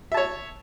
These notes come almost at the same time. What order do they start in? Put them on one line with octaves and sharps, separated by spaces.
E5 A5 C#5